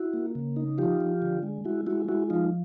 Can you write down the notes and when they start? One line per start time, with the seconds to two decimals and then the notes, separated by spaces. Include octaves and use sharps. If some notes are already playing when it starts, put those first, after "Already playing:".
Already playing: E4 F#4
0.13 A#3
0.35 C#3
0.56 D#4
0.78 F3 F4 G4
1.01 F3
1.22 D3
1.43 G#3
1.65 G#3 E4 F#4
1.87 G#3 E4 F#4
2.08 G#3 E4 F#4
2.30 F3 D#4 F4